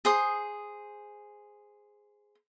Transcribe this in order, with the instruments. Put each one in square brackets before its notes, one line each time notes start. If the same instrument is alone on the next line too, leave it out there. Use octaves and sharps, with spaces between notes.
[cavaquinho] G#4 C5 D#6